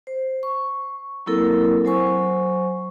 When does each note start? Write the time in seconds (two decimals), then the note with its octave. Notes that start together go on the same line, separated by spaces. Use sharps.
0.07 C5
0.43 C#6
1.26 F#3 A#3 C4 E4 A4 A#4
1.85 F#3 C5 G#5 C#6